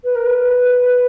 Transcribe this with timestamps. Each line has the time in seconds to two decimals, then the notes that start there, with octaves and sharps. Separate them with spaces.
0.04 B4
0.16 A#4
0.26 B4